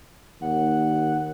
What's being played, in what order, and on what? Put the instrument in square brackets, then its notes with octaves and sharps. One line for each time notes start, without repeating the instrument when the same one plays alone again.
[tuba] D#2 [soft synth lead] F#5